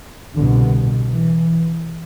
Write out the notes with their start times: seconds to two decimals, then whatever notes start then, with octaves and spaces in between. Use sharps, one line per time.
0.34 C2 B2 D3
1.10 E3